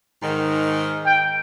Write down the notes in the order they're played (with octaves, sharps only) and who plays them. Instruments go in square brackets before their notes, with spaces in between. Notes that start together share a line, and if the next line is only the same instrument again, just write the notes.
[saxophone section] G#2 D#3
[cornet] G5